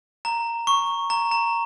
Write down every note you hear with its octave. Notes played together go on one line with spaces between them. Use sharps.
A#5
C#6
A#5
A#5